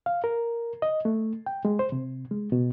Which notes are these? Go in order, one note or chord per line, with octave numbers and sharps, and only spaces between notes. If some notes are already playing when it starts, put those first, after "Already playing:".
F5
A#4
D#5
A3
G5
G#3
C5
C3
G#3
B2